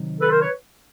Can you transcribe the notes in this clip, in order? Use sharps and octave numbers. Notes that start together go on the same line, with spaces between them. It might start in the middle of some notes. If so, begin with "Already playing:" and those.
Already playing: C3 D#3 F#3
A4 B4
A#4 C5
B4 C#5